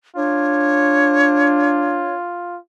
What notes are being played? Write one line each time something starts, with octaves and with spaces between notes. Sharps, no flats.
D4 F4 C#5